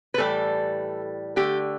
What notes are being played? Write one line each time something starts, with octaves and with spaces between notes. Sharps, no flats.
B4
A2 E3 G3 A4
D3 A3 G4